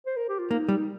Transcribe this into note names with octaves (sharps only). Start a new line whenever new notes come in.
C5
A#4
G4
F4
A#3 D#4
G3